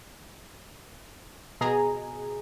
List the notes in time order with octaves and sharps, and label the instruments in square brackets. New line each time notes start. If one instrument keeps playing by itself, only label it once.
[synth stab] B2 G#4 D#5 G#5 A#5